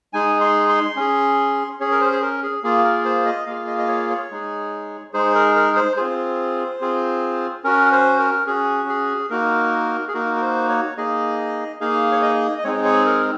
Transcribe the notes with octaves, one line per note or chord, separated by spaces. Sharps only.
G#3 D#4 G#4 G#5
C6
C6
C#4 G#4
C#4 G#4 C#5
A#4
C5
G#4
A#4
G#4
A#3 F4 G#4
A#4
C5
D#5
A#3 F4 G#4 F5
D#5
D#5
C#5
C#5
G#3 D#4 G#4
G#3 D#4 G#4 C5
A#4
A#4
C5
C4 F4 G#4 C5
C4 F4 G#4
C#4 F#4 A#4
C5
A#4
C#4 F#4 G#4
G#4
A#3 D#4 F#4 A#4
G#4
A#3 D#4 F#4 A#4
A#4
C5
C#5
A#3 D#4 G#4 D#5
A#3 D#4 G#4 F5
C#5
D#5
D#5
G#3 C4 D#4 G#4 C#5
C#5
A#4